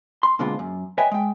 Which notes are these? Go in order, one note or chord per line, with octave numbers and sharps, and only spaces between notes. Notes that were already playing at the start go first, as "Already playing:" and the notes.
C6
B2 D3 G#3 A#3 C4 F4
F#2
B4 C#5 D#5 E5 G5 G#5
G#3 G5